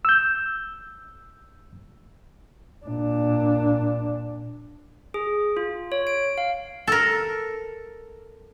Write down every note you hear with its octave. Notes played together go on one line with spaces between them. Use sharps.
E6 G6
A#2 D4
G#4
F4
C#5
D7
F5
A4 A#4